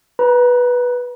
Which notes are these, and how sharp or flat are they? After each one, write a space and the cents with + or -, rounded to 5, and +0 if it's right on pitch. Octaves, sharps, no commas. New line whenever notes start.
B4 -10 A#5 +35